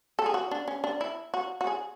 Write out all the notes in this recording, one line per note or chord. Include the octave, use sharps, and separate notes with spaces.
A4
G#4
F#4
D4
C#4
D4
E4
F#4
F#4
G#4